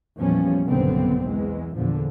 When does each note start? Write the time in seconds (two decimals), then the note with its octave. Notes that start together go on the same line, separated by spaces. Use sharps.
0.17 E2 A#2 F3 G3 C#4
0.65 F#1 B1 G2 D3 B3 C4
1.25 E2 E3 G#3
1.75 E2 A#2 D3 F3